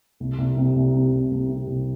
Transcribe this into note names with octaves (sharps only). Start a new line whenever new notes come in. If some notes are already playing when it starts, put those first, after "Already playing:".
C2
C2
C3
C2
C3
C2
C2
C3
C2